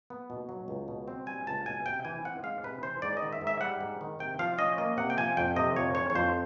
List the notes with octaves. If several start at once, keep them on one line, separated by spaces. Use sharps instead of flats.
B3
B2
F#3
C#2
B2
C4
G3 G#5
C#2 A5
B2 G#5
C3 G5
E3 G#5
C4 F#5
G#3 F5
C3 B4
E3 C5
G#2 D5
D#5
D#3
E5
G#2
E5
G3 F#5
G#2
D#3
C3 G5
F3 F5
C#4 D#5
A#3 D#5
C3 F#5
G5
F3 G#5
F2 G5
C3 D#5
F2 C#5
E3 C#5
C#5
F2 C5